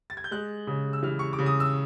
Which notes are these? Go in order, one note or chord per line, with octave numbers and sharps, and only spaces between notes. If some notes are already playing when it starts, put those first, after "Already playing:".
A6
G#6
G6
G#3 F#6
C#3
E6
E3 F6
C#6
D6
C#3
D#6
E6